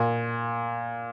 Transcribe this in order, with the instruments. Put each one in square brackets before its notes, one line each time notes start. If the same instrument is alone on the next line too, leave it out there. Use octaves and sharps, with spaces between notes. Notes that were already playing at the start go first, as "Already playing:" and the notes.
Already playing: [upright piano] A#2